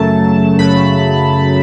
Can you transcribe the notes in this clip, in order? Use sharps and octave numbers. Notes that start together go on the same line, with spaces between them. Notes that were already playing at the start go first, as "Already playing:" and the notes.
Already playing: F#2 C#3 F#3 A3 A5
F#2 C#3 F#3 A3 B5